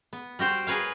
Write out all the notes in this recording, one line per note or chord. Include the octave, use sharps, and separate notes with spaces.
B3
G3 F#4 G4 C5
G#4 A#4 B4 C#5 F5